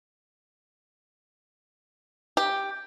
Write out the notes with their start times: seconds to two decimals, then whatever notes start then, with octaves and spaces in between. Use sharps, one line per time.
2.37 G4